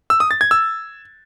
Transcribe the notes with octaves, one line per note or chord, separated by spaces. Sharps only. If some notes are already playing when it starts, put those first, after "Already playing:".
E6
D#6
A6
G#6
E6